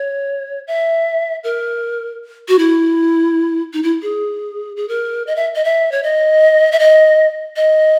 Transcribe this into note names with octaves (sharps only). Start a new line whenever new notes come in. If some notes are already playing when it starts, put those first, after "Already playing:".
Already playing: C#5
E5
A#4
F#4
E4
D#4
E4
G#4
G#4
A#4
D#5
E5
D#5
E5
C#5
D#5
E5
D#5
D#5